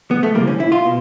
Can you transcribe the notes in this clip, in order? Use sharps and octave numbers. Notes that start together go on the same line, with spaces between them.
B3
A3
D2 C3 E3 G3 A#3
C#4
E4
F4
B2